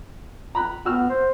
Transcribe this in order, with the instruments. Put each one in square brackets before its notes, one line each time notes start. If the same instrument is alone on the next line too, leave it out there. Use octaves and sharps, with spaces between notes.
[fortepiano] A#5 B5 F#6
[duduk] B3 [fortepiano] F#4 E6 F6
[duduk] C5